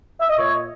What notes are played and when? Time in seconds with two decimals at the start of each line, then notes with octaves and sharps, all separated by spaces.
0.20 E5
0.29 D#5
0.38 A#2 C#5